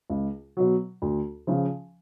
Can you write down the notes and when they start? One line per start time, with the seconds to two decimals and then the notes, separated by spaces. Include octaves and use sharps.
0.10 C#2
0.57 B2 F#3
1.02 D2
1.47 C#3 F3